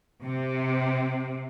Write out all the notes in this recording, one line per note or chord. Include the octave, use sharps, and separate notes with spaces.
C3